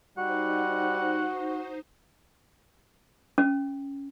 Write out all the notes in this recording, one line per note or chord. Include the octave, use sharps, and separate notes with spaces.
G3 D#4 F#4 C5 F#5
C#4